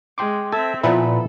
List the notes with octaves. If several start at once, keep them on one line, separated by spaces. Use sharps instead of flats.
G#3 G5 C6 D6
C4 A4 E5 G#6
A#2 F3 B3 E4 A4 B4 A#5 B5